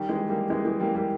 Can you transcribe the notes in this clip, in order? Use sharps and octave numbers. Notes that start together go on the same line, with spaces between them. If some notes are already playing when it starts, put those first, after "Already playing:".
Already playing: D#3 G3
E3 G#3
G3 A#3
E3 G#3
E3 G#3
G3 A#3
G3 A#3